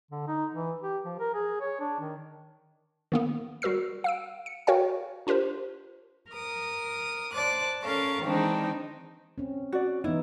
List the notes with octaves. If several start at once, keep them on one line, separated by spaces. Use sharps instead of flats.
D3
D#4
E3
G4
F3
A#4
G#4
C#5
D4
D#3
D#3 A#3 B3
G3 F#4 A#4 E6 C7
F5 E6 D7
C#7
F#4 A#4 C#5 F5 G5 G#5
D4 F4 G4 A#4 C5
A#4 D#6
C5 D5 A5 D6 F#6
C#4 A4 A#4 F5 C#6
D#3 E3 G#3 C4 D4 D#4
C4 C#4
F#4 D5
E3 B3 D#4 E4